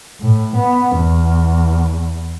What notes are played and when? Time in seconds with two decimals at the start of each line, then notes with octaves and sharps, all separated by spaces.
0.21 A2
0.56 B3
0.96 E2